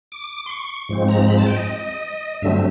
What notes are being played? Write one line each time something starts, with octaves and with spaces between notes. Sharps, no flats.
D6
C6
C#6
G#2 F3 G#3 C4
A#5
B5
A5
G5
D#5
G2 D3 F#3 A3 C4 E5